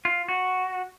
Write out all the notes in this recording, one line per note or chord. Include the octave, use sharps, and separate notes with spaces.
F4
F#4